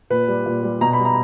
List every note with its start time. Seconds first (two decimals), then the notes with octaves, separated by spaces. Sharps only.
0.10 A#2 B4
0.28 G3
0.46 A#2
0.63 G3
0.81 B2 A#5
0.93 B5
0.99 G3
1.05 A#5